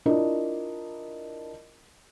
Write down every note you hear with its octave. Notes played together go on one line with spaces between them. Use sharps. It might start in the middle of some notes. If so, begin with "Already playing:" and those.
D4 E4 F4 A#4 D5 D#5